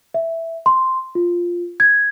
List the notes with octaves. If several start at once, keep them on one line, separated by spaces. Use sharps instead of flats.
E5
C6
F4
G#6